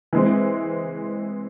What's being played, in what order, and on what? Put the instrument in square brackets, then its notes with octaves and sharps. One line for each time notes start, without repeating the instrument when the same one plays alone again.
[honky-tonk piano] E3 G#3 C4